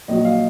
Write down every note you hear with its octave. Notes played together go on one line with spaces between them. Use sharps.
A#1 A#2 F#3 D#5
F5